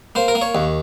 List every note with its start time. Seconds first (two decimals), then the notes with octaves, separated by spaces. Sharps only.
0.15 A#3 C5
0.28 A#4
0.35 A#3
0.41 C#5
0.55 D#2